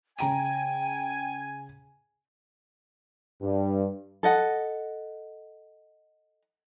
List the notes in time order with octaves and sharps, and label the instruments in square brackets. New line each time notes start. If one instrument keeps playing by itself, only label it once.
[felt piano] C#3 A#5 D#7 [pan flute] G5 [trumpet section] G#5
[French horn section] G2
[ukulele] A4 D#5 F#5